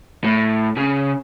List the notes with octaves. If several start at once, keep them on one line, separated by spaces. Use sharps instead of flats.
A2
C#3